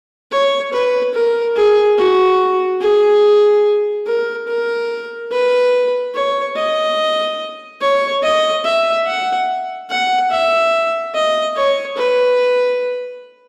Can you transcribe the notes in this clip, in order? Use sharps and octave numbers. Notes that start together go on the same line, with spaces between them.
C#5
B4
A#4
G#4
F#4
G#4
A#4
A#4
B4
C#5
D#5
C#5
D#5
E5
F#5
F#5
E5
D#5
C#5
B4